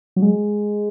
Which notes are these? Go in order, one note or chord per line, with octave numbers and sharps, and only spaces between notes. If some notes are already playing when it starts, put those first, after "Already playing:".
F#3
G#3